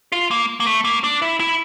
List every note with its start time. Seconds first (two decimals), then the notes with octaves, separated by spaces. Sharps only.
0.12 F4
0.31 A#3
0.60 A#3
0.66 A3
0.84 A#3
1.04 D4
1.22 E4
1.40 E4